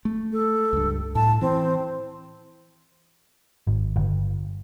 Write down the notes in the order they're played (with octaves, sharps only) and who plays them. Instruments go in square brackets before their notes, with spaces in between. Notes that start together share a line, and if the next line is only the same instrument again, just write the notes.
[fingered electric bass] A3
[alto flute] A4
[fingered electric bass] C#2 G2
[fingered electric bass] A2 [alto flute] A5
[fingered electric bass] E3 [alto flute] C4
[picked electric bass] G#1
G1